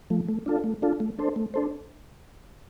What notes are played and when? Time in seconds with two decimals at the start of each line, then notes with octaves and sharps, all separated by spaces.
0.10 F3 A3
0.29 A3
0.46 D4 F4 A4
0.64 A3
0.82 D4 F4 A4
1.00 A3
1.18 D4 A4 C5
1.36 A3
1.54 D4 A4 C5